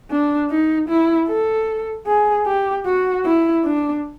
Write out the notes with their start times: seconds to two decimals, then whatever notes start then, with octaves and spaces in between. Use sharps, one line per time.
0.12 D4
0.51 D#4
0.89 E4
1.28 A4
2.07 G#4
2.47 G4
2.86 F#4
3.26 E4
3.65 D4